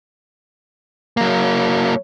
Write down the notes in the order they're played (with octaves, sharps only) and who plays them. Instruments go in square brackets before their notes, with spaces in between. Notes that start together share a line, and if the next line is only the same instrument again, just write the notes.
[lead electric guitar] F#3 A#3